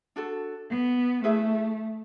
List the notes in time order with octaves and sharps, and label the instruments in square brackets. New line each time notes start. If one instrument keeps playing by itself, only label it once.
[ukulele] D4 F#4 A4
[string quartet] B3
[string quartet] A3 [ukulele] E4 G#4 B4 E5